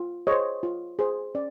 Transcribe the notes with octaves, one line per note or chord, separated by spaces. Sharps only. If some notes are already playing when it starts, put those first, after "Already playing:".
Already playing: F4
G#4 C5 C#5 D#5
F4
G#4 C5
C#4 D5